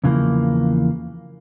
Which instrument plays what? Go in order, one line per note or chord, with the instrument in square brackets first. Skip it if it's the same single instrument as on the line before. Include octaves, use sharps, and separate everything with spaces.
[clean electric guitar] E2 C#3 E3 F3 A#3